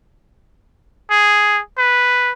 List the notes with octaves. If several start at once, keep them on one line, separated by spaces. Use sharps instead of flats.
G#4
B4